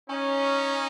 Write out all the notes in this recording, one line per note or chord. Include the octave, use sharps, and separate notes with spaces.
C#4 D#4